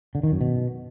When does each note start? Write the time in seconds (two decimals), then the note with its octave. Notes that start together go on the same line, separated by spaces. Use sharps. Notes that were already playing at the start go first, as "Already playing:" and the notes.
0.15 D3
0.23 D#3
0.32 F#2
0.41 B2